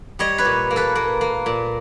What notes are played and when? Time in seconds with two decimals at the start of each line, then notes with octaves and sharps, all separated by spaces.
0.19 G3 C#5 D#5
0.38 B4 C#5
0.45 A#2
0.71 A#3
0.76 A4 B4
0.95 A#3
1.21 A#3
1.46 A#2